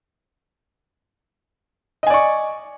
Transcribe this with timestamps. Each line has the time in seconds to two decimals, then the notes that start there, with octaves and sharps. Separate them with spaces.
2.03 D#5
2.07 G#5
2.10 D5
2.14 C#6